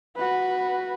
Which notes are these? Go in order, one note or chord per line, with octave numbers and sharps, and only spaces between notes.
F#4 B4